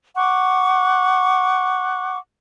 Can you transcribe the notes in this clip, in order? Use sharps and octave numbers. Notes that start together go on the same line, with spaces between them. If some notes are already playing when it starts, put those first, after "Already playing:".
F#5 C#6 D6